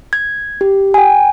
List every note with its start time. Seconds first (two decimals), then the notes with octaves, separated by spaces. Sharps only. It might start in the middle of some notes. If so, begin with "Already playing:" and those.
0.13 G#6
0.61 G4
0.94 G5 G#5